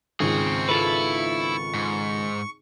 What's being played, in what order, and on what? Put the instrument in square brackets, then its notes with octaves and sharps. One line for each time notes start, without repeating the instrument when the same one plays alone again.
[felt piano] G#1 C#2 [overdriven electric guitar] C4 G#4 [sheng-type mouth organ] C#6
[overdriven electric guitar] E4 [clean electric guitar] F4 A4 B4
[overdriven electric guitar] G#2